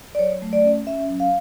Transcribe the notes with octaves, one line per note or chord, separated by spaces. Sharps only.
D5
F#3 C#5
A3
D5
C#4
C#4 E5
F#3
F5